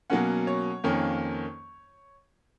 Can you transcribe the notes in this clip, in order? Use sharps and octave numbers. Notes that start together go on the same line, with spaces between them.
B2 F#3 A#3 C#4 F#5
C#5
F2 D#3 A#3 C#4